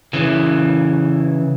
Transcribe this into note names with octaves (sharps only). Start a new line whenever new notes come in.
C#3 E3